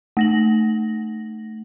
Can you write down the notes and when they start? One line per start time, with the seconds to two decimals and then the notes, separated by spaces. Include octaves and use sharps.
0.17 A3 A#6 F#7